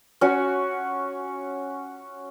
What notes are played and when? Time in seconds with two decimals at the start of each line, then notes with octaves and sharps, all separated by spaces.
0.21 C#4 F#4